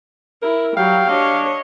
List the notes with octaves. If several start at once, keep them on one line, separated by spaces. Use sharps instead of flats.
E4 A#4
F#3 G3 F5 G5
D4 C#5 D#5